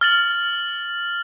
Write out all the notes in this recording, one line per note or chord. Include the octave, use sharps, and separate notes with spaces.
F6 A6 F#7